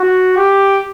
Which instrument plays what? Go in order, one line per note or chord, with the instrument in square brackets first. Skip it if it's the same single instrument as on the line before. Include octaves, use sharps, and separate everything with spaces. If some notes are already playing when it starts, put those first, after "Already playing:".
Already playing: [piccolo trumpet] F#4
G4